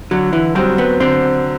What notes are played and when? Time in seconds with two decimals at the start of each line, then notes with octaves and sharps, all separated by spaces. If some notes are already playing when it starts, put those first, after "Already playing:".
0.11 D3 F#3
0.33 E3
0.55 F#3 G3 C4
0.78 B3
1.00 D3 C4